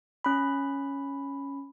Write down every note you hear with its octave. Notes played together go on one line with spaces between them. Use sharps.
C#4 B5